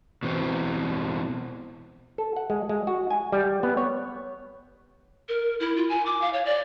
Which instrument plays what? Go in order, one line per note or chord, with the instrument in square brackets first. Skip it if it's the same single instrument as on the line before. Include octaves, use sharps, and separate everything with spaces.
[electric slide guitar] B2 E3 C4
[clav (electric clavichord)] A4
F#5
G#3
G#3
F#4
G#5
G3
B3
C#5
[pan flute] A#4
E4
F4
G#5
D6
F5
C#5
D5